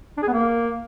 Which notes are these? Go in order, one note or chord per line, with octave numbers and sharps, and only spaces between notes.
D4
G#4
B3
A#3